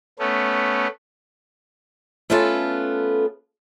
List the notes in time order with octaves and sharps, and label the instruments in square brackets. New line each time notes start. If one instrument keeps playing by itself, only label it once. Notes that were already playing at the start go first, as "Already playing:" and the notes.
[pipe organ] A3 B3 C#4
[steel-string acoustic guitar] A3 B3 C#4 F4 A4 B4